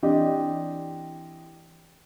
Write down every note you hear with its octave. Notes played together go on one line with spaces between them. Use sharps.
E3 C4 D4 G4 D5 D#5